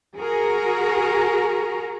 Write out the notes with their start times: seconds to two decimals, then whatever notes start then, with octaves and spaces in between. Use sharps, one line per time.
0.17 F#4 G#4 A#4